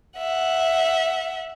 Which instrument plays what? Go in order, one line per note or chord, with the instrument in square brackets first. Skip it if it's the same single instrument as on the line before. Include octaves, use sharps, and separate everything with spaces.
[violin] E5 F#5